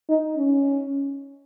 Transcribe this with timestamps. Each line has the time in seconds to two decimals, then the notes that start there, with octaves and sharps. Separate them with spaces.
0.09 D#4
0.36 C#4